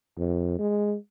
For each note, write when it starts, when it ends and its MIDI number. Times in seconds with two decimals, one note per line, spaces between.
0.18 0.59 41
0.59 0.95 56